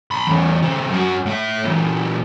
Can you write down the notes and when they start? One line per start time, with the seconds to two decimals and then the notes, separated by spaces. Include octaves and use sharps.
0.11 B5 C6
0.27 E2 C#4
0.63 C#3 C4
0.90 F#2 F#4
1.26 A2 E5
1.65 A#2 E3